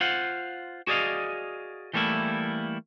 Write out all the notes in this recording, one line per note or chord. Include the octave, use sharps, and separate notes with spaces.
F4 C5 F5 F#5
F#4 G#4 D5 D#5 F5
E3 G3 A3 A#3 E4